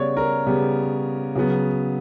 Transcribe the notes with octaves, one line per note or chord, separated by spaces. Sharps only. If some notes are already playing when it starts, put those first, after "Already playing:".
Already playing: C#3 G3 B3 C#5 D5
A#4
C#3 G3 B3
C#3 F#3 B3